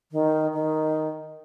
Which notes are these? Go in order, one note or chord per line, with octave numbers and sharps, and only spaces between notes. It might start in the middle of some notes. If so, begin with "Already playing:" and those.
D#3
D#3